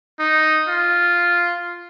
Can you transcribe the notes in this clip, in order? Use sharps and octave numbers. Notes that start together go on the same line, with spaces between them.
D#4
F4